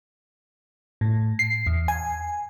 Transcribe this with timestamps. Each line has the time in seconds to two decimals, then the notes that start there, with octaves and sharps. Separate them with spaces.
1.01 A2
1.39 C7
1.66 E2
1.88 G#5